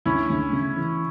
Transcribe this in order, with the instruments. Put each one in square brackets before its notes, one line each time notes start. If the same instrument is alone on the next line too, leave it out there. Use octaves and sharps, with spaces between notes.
[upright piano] D2 [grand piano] C#4 E4
[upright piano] D2
C#3
E3